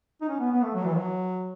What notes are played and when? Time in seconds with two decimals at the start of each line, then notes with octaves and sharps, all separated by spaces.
0.21 D#4
0.29 C#4
0.39 B3
0.51 B3
0.62 A3
0.74 F#3
0.85 E3
0.96 F#3